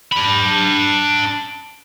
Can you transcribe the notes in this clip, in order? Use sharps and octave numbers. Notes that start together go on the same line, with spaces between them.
D4 B5